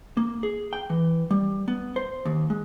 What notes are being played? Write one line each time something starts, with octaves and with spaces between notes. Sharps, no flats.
A#3
G#4
G5
E3
G3
B3
C5
D#2
G#3